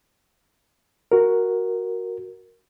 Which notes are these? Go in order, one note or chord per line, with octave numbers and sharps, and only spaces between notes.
F#4 A#4